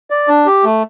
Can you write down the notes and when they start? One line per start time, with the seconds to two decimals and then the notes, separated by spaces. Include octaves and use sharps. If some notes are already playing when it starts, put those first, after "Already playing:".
0.10 D5
0.28 D4
0.46 G4
0.64 A3